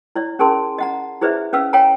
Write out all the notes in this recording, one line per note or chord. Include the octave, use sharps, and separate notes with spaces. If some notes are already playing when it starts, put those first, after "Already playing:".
E4 C#5 D5
C#4 G#4 A#4 G#5 A5 C6
D#5 F#5 A#5
E4 G#4 B4 C5 D5 E5
C#4 B4 F5 E6
C#5 F5 G5 G#5 A#5